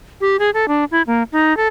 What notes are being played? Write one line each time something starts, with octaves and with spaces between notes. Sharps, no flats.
G4
G#4
A4
D4
E4
A#3
D#4
A4